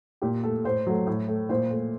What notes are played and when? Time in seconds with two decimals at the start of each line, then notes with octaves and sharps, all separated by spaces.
0.22 A#2 G4
0.43 A3 A4
0.64 A2 C5
0.87 F#3 A3
1.07 A2
1.28 A3
1.49 A#2 C5
1.71 A3